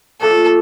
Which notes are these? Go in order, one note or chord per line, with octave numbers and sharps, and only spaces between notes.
A#2 F3 A3 D4 A4